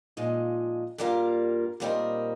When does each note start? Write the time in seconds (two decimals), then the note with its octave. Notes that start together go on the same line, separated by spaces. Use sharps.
0.17 A#2 F3 G#3 D#4
0.98 G2 G3 A#3 F4 A#4
1.80 A#2 G3 C4 D#4 A#4